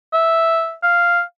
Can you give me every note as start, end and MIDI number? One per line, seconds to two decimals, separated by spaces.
0.13 0.74 76
0.83 1.22 77